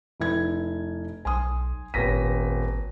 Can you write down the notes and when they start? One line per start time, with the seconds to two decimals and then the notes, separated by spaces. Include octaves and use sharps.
0.20 F1 E4 G#6
1.25 B1 G#5 C6 D#6
1.94 D#1 G#1 B3 A#6 B6 D#7